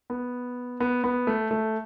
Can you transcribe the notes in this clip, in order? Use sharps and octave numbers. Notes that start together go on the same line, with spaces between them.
B3
B3
B3
A3
A3